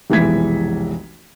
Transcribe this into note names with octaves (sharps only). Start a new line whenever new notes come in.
F1 B1 E3 G#3 G#6 B6